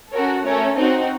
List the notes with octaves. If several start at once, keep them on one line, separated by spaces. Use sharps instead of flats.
C#4 F#4 A4 A#4 C#5
A3 C#4 A4 A#4 C#5
C4 D#4 F#4 C5 D#5